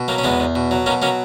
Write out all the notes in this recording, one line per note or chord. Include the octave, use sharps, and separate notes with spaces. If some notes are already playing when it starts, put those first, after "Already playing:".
Already playing: B2
F#3 A#3
C#4
E2 G#3 B3
E2
B2
F#3
B2 A#3 C#4
F#3 A#3 C#4